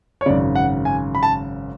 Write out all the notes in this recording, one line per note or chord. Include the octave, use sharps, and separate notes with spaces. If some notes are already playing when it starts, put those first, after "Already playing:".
C#5
G#1 F#2 C#3 D5
F#5
G#5
B5
A5